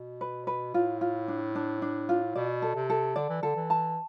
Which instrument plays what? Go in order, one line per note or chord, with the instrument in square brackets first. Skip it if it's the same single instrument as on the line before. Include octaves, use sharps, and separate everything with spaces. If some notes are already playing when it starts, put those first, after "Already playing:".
Already playing: [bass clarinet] B2
[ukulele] B4
B4
[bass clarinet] A2 [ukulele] F4
[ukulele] F4
D4
D4
D4
F4
[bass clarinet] B2 [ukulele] D5
[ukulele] A4
[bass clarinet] C3
[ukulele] A4
[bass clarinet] D3 [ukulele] D5
[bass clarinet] E3
[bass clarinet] D3 [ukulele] A4
[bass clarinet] E3
[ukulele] A5